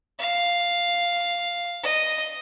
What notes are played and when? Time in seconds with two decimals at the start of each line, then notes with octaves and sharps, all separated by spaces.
0.19 F5
1.82 D#5